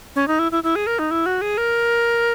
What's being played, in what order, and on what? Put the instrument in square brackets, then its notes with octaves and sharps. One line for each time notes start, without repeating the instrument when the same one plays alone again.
[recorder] C#4
D#4
E4
E4
E4
G#4
A#4
D#4
E4
F#4
G#4
A#4